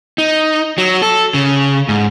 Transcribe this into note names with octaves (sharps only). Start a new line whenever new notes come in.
D#4
F#3
A4
C#3
G#2